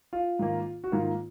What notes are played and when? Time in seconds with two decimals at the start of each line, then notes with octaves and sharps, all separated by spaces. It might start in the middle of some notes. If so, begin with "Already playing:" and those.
0.13 F4
0.39 G#2 D#3 A#3
0.84 F#4
0.92 G#2 D#3 A#3 F4